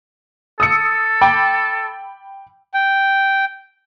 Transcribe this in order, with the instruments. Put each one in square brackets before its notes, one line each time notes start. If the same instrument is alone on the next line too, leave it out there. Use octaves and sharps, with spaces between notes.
[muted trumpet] A4 [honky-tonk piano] D#6 E6 C#7
[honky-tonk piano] G5 B5 D6
[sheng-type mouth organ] G5